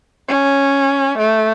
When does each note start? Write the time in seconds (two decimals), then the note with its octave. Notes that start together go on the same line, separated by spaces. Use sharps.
0.28 C#4
1.18 A3